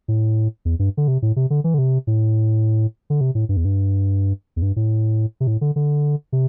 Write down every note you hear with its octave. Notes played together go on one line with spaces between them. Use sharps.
A2
E2
G2
D3
C3
A2
C3
D3
E3
D3
C3
A2
D3
C3
A2
G2
E2
G2
E2
G2
A2
C3
A2
D3
D3
C3